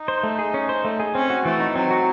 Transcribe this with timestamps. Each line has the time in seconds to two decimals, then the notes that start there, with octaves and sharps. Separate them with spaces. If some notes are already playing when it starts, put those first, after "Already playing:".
Already playing: D#4
0.08 C5
0.23 A3
0.39 G#4
0.54 C#4
0.69 C5
0.85 A3
1.00 G#4
1.15 C4 C#4
1.30 F#4
1.45 E3 A3
1.60 D#4
1.75 F#3 C4
1.91 F#4